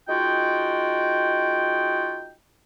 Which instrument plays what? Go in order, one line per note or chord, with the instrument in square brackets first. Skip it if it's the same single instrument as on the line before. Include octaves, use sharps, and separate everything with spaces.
[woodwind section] G#3 D#4 F4 F#4 G5